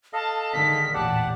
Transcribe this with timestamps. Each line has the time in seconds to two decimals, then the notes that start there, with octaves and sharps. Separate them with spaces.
0.13 A4 D#5 F5 A5
0.53 D3 D#3 G#3 B6
0.94 A1 E2 A#2 G4 D5 F#5 A5